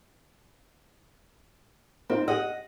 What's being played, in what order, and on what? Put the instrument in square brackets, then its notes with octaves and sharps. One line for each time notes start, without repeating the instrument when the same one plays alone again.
[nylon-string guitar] C4 [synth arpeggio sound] D#4 F4 A#4
[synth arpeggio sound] G4 D#6 [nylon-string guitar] D#5 F#5